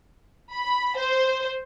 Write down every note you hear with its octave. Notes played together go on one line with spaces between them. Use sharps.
B5
C5